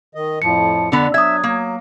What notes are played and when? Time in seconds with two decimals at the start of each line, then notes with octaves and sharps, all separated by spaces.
0.15 D#3 D#5
0.42 F2 A2 F3 C#7
0.92 F2 D3 B3 D4 F#5
1.14 F#3 D4 E5 D#6 G#6
1.44 F#3 A#3